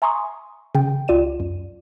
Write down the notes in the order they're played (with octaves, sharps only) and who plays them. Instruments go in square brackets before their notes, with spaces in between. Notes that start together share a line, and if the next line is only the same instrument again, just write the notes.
[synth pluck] E5 G#5 A#5 C6 C#6 D#6
C#3 G5
C#2 F4 D5 D#7 E7
F#2